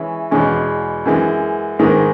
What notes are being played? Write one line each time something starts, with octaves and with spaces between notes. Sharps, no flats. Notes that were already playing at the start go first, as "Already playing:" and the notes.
Already playing: E3 G#3 C#4 E4
E2 B2 G#3 C#4
F#2 E3 G#3
G#2 D#3 G#3 B3